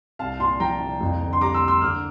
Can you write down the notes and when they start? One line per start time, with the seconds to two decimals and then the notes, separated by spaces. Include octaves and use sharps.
0.19 C2 F5 A5
0.39 A#2 A5 C6
0.60 F3 G5 A#5
0.80 C2
1.01 F2
1.21 D3
1.33 C6
1.41 G3 A#5 D6
1.54 C6 E6
1.61 A#3
1.68 C6 E6
1.81 D3 D6 F6